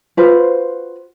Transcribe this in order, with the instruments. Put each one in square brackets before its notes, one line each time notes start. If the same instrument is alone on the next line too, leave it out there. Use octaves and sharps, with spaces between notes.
[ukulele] F4 F#4 B4 C5